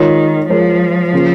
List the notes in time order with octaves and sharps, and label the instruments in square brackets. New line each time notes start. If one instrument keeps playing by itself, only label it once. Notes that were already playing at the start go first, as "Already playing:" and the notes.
Already playing: [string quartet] D#3 [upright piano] G#3 F4 A#4 C#5
[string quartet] F3 [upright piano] G#3 F4 A#4 C#5
[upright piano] C#3 A#3 F4 C#5